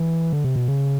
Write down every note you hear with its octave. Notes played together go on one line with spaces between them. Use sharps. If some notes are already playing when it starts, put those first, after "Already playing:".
Already playing: E3
D3
C3
B2
C#3